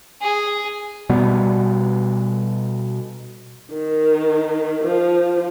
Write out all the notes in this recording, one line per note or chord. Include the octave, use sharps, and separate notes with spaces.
G#4
B2 G3 B3
D#3
F3